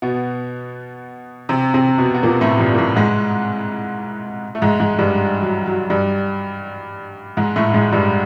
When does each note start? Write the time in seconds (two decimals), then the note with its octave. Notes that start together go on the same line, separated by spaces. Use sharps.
0.02 B2 B3
1.49 C3 C4
1.74 C3 C4
1.98 B2 B3
2.14 B3
2.23 A#2 A#3
2.41 A2 A3
2.59 G2 G3
2.74 A#3
2.78 A2 A3
2.96 G#2 G#3
4.55 A3
4.62 G#2 G#3
4.80 G#2 G#3
4.99 G2 G3
5.41 F#3
5.66 F#3
5.90 G2 G3
7.37 G#2 G#3
7.56 A2 A3
7.74 G#2 G#3
7.92 G2 G3